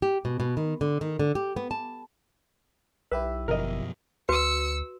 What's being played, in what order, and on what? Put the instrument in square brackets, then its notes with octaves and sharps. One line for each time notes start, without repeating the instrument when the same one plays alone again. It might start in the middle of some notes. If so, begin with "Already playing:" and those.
[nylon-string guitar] G4
B2
B2
D#3
D3
D#3
D3
G4
B3
A5
[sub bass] B1 [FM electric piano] E4 G4 E5 [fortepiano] B4
[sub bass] G1 [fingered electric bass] F#2 B2 F3 [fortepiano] A#4 D#5
[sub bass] D2 [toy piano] F#4 B4 [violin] E6 C#7